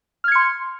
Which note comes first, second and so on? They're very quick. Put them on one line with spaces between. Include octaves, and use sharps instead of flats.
F6 G#6 C#7 C6